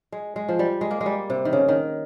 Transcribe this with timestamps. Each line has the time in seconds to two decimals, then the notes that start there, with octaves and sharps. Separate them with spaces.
0.12 G#3
0.36 G#3
0.49 F3
0.59 G3
0.81 G#3
0.91 A#3
1.01 G#3
1.06 G3
1.30 C3
1.45 D#3
1.53 C#3
1.69 D#3